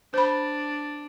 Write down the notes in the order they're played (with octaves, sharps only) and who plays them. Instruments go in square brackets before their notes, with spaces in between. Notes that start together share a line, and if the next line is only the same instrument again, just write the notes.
[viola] D4 [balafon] C5 B5